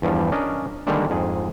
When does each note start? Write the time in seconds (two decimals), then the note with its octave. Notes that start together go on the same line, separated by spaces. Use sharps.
0.02 E2 G2 F3 G3
0.32 C#4 D4 A#4 D#5
0.87 D3 D#3 G3 G#3 A#3 D4
1.10 F2 G#2 G#4